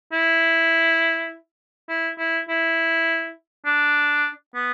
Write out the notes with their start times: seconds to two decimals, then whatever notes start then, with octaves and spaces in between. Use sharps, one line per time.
0.13 E4
1.89 E4
2.18 E4
2.49 E4
3.66 D4
4.55 B3